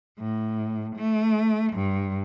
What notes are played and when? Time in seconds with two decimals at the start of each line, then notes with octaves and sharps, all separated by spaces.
0.19 A2
0.96 A3
1.73 G2